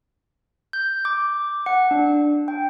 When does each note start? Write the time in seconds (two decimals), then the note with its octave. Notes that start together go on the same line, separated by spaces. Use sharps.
0.73 G6
1.05 D6
1.66 F#5
1.91 D4
2.48 G5